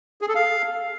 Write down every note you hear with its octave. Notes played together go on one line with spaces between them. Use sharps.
G#4
A4
F5